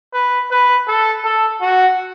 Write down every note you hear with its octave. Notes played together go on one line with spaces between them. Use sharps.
B4
B4
A4
A4
F#4